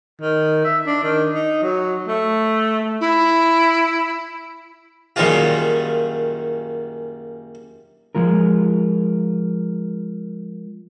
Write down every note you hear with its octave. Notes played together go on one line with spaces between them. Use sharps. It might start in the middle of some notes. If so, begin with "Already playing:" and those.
D#3
E5
D4
D#3
D#4
F#3
A3
E4
F#2 A#2 D#3 G3 G#3 F4
F3 G#3 F4 A#4